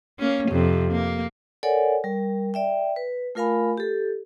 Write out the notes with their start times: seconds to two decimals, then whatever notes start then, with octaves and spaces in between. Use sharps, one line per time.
0.19 A#3 C#4
0.49 F2 C3
0.91 A#3
1.63 A4 A#4 C#5 D5 F#5 G#5
2.04 G3 A#4
2.54 D5 E5 G5
2.96 B4
3.35 A3 F4 A#4 F5 G#5 B5
3.78 G4 A4